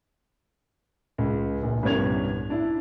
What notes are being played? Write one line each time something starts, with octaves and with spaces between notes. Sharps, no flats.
C#2
A#1
C2 G2 B3 C#4 G#6 F7
D4 E4